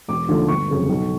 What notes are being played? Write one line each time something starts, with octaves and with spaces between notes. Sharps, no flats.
E1 D6
D#2 D3 F3 A3
G1 C#6
F2 C#3 F#3
B1